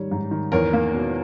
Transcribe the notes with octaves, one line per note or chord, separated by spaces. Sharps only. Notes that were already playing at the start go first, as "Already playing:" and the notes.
Already playing: G#2 D#3 G3 C#5
G#2
D#3
E2 A#4 C#5
A#3
B2